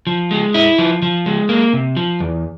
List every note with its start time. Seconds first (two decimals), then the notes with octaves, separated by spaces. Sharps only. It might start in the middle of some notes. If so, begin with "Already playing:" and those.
0.07 F3
0.31 G#3
0.54 E4
0.78 F3
1.02 F3
1.26 G#3
1.49 A#3
1.73 C3
1.97 F3
2.20 E2